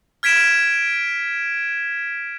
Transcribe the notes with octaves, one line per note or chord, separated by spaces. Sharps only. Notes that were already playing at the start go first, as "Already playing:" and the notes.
F6 G#6 B6 D7 E7